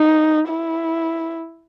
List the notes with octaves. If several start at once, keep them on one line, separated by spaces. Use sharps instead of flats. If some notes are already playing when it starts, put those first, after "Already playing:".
Already playing: D#4
E4